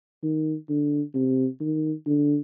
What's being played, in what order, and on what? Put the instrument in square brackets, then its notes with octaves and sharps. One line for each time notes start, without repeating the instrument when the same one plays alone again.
[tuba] D#3
D3
C3
D#3
D3